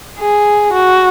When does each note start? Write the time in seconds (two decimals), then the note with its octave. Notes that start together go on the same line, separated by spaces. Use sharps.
0.18 G#4
0.72 F#4